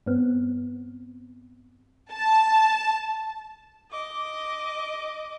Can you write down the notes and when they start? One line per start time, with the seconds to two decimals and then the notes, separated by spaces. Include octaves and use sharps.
0.06 G2 B3 C4
2.12 A5
3.91 D#5 D6